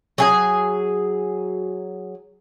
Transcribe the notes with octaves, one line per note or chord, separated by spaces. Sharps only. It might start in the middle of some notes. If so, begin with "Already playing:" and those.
F#3 G#4 G#5